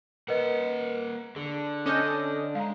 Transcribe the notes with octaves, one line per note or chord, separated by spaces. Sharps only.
A#3 A#4 B4 D#5 F#5
D3 G#4
C#4 A4 D#5 D6 F6 G6
G#3 F5 A#5